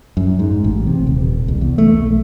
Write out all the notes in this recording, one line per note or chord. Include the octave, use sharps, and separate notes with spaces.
F#2
G#2
A1
C3
D#1
C2
E2
A3
B1